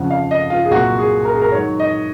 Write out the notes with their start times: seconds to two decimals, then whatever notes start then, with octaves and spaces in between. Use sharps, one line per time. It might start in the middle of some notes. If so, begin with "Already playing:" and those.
Already playing: F2 C#3 F3 F#5
0.11 F5
0.31 D#5
0.50 F4
0.65 G#4
0.71 C2 A#2 F#3 F#4
0.98 G#4
1.25 A#4
1.34 G#4
1.42 A#4
1.52 G#2 D#3 F#3 C#5
1.80 D#5